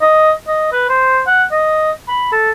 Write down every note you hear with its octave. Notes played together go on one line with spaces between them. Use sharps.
D#5
D#5
B4
C5
F#5
D#5
B5
A4